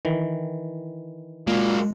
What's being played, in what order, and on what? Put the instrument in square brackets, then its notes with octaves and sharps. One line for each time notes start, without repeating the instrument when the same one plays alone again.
[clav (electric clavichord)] D#3 E3
[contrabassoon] A#2 [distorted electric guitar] F#3 A#3 [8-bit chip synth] G#3